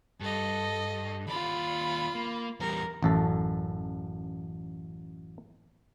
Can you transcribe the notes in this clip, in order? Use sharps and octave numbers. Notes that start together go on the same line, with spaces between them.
G2 A4 D#5
D#2 F4 D5 B5
A#3
E2 G3 A#4
A1 F#2 A4